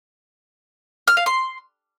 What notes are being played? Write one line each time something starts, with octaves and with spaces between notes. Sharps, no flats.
F6
F5
C6